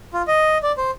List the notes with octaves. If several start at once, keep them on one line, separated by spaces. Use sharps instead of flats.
F4
D#5
D5
C5